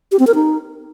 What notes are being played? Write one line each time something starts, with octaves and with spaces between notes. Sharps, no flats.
G4
C4
A#4
D#4